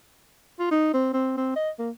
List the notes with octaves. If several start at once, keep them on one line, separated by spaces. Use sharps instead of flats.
F4
D#4
C4
C4
C4
D#5
A#3